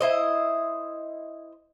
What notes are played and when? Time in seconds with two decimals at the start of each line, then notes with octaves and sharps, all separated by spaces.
0.01 E4 C5 D#5